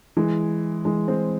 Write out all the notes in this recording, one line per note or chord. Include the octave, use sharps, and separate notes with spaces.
E3 G#3
E3 G#3
G#3 C4